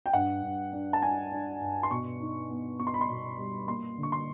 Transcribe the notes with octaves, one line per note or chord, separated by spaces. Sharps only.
G5
G2 F#5
G2
D4
A5
D4 G#5
D4
G2
C6
B2 C#6
D#4
B3
B3 C#6
C6
B5
C6
B2
G3
A#3 C6
D3
C#6
C6